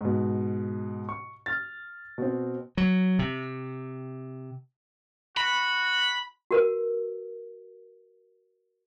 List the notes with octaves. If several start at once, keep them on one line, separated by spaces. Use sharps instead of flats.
G#2 B2
C#6
F6 A6
B2 C4
F#3
C3
F#4 B5
F#4 A#4 B4